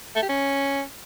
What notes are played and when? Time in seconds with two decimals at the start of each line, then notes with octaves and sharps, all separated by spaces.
0.16 A3
0.23 G4
0.29 C#4